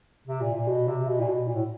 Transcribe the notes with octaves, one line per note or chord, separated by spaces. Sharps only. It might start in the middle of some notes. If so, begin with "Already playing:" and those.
C3
A#2
A#2
B2
C3
B2
A#2
B2
A#2
A2